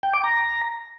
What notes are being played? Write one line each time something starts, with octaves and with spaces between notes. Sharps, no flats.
G5
D6
A#5